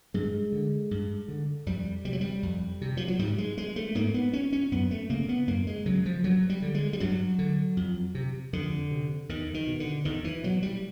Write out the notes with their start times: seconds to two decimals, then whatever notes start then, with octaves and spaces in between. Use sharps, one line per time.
0.14 G2 G#3
0.52 D3
0.91 G2
1.28 D3
1.66 F2 G3
2.05 C3 G3
2.13 F#3
2.21 G3
2.43 F2
2.81 C3
2.97 F3
3.08 F#3
3.19 G#2 G3
3.38 G#3
3.58 G#3
3.76 A3
3.95 G#2 A#3
4.14 B3
4.33 C#4
4.52 C#4
4.72 F#2 B3
4.91 A3
5.10 C#3 A#3
5.29 B3
5.47 F#2 A#3
5.67 G#3
5.86 C#3 F#3
6.06 F3
6.24 G2 F#3
6.50 G3
6.62 D3
6.75 G#3
6.93 G3
7.00 G2 F#3
7.39 D3
7.77 F2
8.15 C3
8.53 F2 D3
8.91 C3
9.29 E2 D#3
9.54 D#3
9.67 B2
9.80 D3
10.05 E2 D#3
10.24 E3
10.43 B2 F#3
10.63 G3